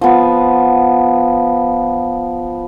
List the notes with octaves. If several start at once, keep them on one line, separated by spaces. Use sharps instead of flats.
F3 B3